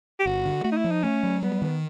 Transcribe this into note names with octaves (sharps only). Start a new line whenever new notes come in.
G4
G1 F#4
D3
A3 F#4
D#4
E4
F3
D#4
A3 C#4
F#3
G3 B3
D#3